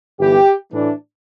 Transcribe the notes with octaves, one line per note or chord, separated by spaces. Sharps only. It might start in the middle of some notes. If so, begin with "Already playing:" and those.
G1 G2 E3 B3 G4
A2 E3 A3 D4